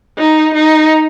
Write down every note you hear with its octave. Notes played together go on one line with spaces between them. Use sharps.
D#4
D#4